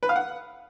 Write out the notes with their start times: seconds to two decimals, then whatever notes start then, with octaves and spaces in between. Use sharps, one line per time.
0.03 B4
0.09 F5
0.16 F#5